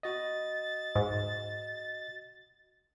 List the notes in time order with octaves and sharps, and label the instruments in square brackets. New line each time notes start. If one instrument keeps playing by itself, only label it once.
[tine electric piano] F#4 D#5 [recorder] A6
[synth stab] G#2